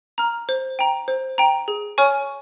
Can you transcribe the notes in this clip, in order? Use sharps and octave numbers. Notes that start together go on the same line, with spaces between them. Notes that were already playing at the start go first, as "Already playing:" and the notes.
A#5 F6
C5
G5 A#5
C5
G5 A#5
G#4
C#5 G#5 C#6 F6